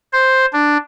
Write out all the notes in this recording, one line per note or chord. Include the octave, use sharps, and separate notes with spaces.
C5
D4